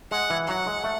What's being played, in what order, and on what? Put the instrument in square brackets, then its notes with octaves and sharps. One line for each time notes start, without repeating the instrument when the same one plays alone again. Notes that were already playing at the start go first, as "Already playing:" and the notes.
[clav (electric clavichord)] G#3 [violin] F#5
[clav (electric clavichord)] E3
[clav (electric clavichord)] F#3 [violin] F#5
[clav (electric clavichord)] G#3
A3